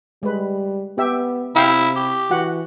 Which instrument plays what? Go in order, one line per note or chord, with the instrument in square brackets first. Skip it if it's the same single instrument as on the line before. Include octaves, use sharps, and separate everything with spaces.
[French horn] G3 [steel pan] G#3 B4
[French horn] B3 [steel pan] G4 E5
[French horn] C3 [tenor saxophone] E4 [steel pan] F5 G5
[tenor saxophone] G4
[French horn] E3 [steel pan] F#4 F#5